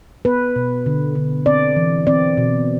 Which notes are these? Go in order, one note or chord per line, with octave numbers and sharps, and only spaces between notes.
B3 B4
B2
D3
D3
C4 D5
E3
C4 D5
B2